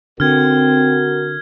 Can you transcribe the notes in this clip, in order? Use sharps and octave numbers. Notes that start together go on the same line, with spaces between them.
D3 C4 F#4 A#4 F6 G#6